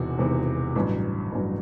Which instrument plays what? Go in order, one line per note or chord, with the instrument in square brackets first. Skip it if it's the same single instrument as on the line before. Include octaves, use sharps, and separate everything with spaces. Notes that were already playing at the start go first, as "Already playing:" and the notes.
Already playing: [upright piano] E1 E2 C3 D#3 F#4
E1 E2 C3 D#3
A1 G2 F#3
A1 G2 F#3